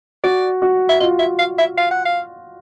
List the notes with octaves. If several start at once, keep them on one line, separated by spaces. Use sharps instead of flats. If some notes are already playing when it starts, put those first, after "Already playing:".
F#4 D5
F#4
E5
F4 D#5
E5
F5
E5
F5
F#5
F5